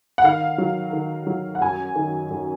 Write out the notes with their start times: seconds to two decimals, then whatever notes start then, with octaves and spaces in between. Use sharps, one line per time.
0.18 F#5
0.24 D#3 F5
0.58 F#3
0.93 D#3
1.27 F#3
1.55 F#5
1.61 F#2 G#5
1.95 D#3
2.30 F#2